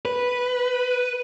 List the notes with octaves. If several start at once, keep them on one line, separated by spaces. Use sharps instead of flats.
B4